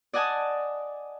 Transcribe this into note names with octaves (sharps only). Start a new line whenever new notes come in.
D5 D#5 F#5 G#5 A5 D#6